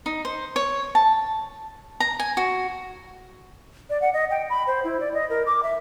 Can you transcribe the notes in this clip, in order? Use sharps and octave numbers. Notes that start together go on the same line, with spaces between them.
D#4
C5
C#5
A5
A#5
G#5
F#4
D5
F#5
D#5
G5
B5
C5
E4
D5
D#5
A#4
D6
E5